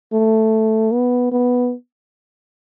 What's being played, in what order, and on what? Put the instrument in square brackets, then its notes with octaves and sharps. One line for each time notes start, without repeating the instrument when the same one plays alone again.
[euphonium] A3
B3
B3